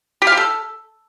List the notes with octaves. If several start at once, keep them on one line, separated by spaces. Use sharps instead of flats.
G4
F5
G4
A4